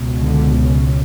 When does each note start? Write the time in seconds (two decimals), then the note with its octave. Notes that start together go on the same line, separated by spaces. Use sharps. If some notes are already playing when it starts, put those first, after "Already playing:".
Already playing: C#2 B2
0.22 D3
0.58 C#3